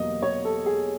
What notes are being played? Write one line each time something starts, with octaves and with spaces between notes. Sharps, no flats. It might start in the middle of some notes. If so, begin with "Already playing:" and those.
Already playing: E2 B2 F#3 A#3 D#5
C#5
A4
G#4